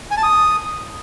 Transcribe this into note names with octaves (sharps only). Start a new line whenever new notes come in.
G#5
A5
D#6